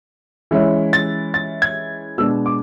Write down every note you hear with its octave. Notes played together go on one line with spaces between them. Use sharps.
E3 G#3 C#4 E4
A6
A6
G#6
B2 G#3 B3 D4 E6
D6